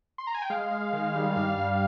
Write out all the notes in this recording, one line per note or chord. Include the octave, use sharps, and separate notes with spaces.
C6
A#5
G#5
G5
G#3 F5
G#3
D#3
G3
G2 F5
G2